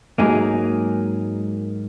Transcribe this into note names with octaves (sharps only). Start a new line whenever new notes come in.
G#2 F#3 A#3 D#4 G#4